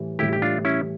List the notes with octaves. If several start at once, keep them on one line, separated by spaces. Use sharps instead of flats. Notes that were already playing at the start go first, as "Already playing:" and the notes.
Already playing: A2 E3 G3
A2 E3 G3 E4 G4
G4
D4 F4
C#4 E4